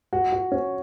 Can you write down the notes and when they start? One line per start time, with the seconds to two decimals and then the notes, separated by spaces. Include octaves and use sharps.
0.13 F#4
0.32 F#4
0.52 C#4